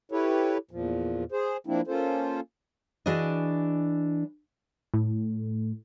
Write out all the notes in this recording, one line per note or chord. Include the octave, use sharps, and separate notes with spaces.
E4 G4 A4 B4 C#5
E2 A#2 F3
G#4 C5
F3 A#3 C4 D4 E4
A#3 C#4 F4 A4 C5
E3 D4 F#4 G#4 D#5
A2